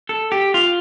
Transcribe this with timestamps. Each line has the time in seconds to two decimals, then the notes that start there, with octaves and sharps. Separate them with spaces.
0.09 A4
0.32 G4
0.54 F4